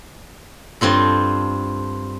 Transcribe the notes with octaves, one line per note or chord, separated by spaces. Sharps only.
G2 C4 F4 A4